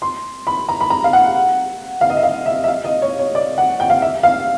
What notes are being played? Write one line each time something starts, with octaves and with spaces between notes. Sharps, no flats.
C6
B5
A#5
B5
A#5
F5
F#5
F5
D#5
E5
F5
E5
E5
F5
D#5
C#5
C#5
D5
F#5
G5
F5
E5
F5